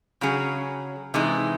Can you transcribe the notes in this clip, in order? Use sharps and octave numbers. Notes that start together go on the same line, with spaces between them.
C#3 F#3 C#4 G#4
C3 E3 G#3 D#4